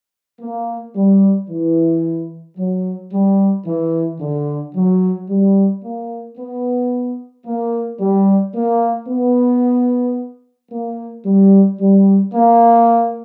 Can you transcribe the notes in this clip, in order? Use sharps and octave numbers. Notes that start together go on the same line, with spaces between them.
A#3
G3
E3
F#3
G3
E3
D3
F#3
G3
A#3
B3
A#3
G3
A#3
B3
A#3
G3
G3
A#3